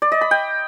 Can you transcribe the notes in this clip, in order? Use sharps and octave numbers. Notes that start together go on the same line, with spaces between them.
D5
D#5
B5
G5